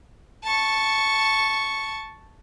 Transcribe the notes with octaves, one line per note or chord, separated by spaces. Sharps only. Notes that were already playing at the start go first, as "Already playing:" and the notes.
A5 C#6